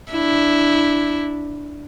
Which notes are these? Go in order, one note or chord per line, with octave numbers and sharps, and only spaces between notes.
D4 E4